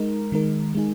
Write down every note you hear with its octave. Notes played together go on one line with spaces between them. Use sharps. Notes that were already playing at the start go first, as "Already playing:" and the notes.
Already playing: G#3 D#4 A#4
D#3 G#3 D#4 A#4
G#3 D#4 G#4